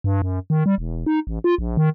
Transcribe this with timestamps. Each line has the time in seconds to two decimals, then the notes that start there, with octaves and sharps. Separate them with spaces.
0.04 G2
0.22 F#2
0.50 D#3
0.66 G3
0.78 E1
1.06 D#4
1.27 A1
1.44 F4
1.58 A#1
1.77 D#3